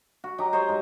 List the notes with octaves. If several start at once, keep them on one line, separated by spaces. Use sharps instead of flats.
F#4
F#3 D#4 G4 A#5
C5 C#5 D#5 C6
G#2